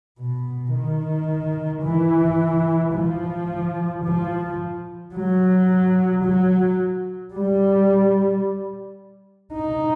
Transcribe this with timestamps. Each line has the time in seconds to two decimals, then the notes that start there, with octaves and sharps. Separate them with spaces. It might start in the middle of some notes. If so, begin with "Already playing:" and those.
0.19 B2
0.74 D#3
1.84 E3
2.94 F3
4.04 F3
5.14 F#3
6.24 F#3
7.34 G3
9.54 D#4